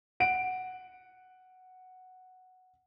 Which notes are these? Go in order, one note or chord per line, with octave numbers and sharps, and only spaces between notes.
F#5 D7